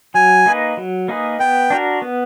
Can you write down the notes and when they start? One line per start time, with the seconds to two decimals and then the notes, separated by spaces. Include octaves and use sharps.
0.14 F#3 G#5
0.46 A#3 D#4 G#4 B4
0.77 F#3
1.08 A#3 D#4 G#4 B4
1.40 B3 G5
1.70 D4 F#4 A#4
2.02 B3